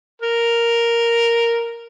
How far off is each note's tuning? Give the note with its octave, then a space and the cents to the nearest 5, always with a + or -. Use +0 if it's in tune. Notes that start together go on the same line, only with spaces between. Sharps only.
A#4 +0